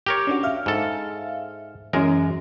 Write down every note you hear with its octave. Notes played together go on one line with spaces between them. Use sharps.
G4 A#4 C#5
C#4 D4 F#4
E5 F5 F6
G#2 A4
F#2 E3 G#3 C#4 A#4